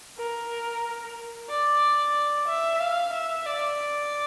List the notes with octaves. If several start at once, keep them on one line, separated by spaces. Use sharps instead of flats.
A#4
D5
E5
F5
E5
D5